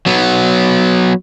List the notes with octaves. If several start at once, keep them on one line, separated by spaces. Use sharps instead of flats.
F#3 B3